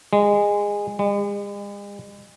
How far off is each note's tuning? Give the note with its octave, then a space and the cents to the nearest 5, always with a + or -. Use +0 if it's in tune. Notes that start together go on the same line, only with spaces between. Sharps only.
G#3 -20
G#3 -45